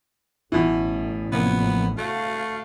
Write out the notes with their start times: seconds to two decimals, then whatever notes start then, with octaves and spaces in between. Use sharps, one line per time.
0.52 A1 B2 E3
1.32 C3 F3 A#3 B3
1.98 A3 F#4 F5